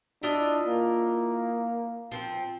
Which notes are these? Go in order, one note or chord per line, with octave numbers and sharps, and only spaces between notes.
D4 E4 F4 D#5
A#3
F3 B3 C4